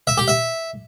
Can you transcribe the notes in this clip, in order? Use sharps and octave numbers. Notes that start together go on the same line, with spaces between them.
E5
G4
E5